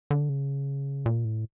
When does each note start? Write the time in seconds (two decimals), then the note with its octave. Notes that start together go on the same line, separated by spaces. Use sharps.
0.11 D3
0.29 C#3
1.06 A#2
1.25 A2